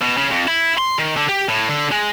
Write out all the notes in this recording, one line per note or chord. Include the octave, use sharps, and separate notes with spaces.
B2
C#3
F2
E4
C6
D#3
D3
G4
A2
D3
G#3